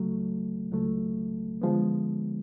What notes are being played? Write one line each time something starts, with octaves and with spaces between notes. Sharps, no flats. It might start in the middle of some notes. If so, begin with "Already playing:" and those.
Already playing: C#2 C#3 F#3 A3
C#2 C#3 F#3 A3
D3 F3 G#3 B3